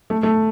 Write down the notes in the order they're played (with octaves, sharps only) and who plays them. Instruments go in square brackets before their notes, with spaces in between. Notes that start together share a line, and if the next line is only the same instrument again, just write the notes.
[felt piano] A3
A3